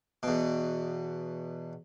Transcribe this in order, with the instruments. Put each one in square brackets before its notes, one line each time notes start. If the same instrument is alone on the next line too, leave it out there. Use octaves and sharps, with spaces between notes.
[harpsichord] E2 B2